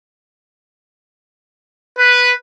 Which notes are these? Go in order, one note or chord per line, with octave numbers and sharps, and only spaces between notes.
B4